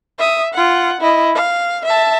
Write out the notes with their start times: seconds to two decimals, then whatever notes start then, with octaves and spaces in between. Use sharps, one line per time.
0.18 E5 D#6
0.53 F4 F#5
1.01 E4 D#5
1.35 F5
1.85 E5 A5